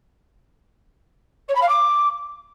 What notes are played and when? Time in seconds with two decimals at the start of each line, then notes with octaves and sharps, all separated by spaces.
1.48 C#5
1.55 B5
1.61 F5
1.68 D6